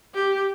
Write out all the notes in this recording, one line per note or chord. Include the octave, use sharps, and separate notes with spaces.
G4